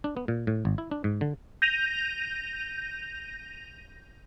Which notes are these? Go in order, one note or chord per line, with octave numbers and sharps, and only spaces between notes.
D4
B3
A#2
A2
G#1
E4
D4
G#2
D3
G6 A#6 D#7 F7